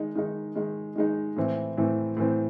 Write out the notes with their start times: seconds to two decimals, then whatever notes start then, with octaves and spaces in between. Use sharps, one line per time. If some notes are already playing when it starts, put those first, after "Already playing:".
Already playing: D#3 G#3 D#4
0.16 D#3 G#3 D#4
0.56 D#3 G#3 D#4
0.96 D#3 G#3 D#4
1.36 A2 E3 C4
1.78 A2 E3 C4
2.17 A2 E3 C4